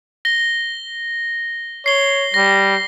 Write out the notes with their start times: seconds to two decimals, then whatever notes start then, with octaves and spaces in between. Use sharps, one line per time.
0.25 A#6 G7
1.86 C#5 C7 G7
2.34 G3 A#6